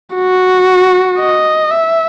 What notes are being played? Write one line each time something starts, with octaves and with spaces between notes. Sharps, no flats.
F#4
D#5
E5